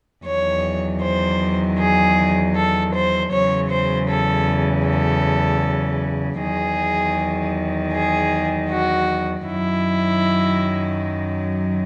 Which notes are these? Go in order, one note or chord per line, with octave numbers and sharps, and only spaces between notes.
E2 D#3 F#3 C#5
C5
G#4
A4
C5
E2 C#3 F#3 C#5
C5
A4
A4
E2 D#3 F#3 G#4
G#4
F#4
F#2 D#3 F#3 E4